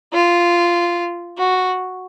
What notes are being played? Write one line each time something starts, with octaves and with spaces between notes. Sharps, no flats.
F4
F#4